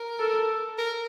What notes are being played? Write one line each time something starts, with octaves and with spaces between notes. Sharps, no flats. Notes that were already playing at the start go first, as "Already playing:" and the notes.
Already playing: A#4
A4
A#4